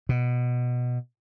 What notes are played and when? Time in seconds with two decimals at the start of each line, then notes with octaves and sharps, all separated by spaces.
0.09 B2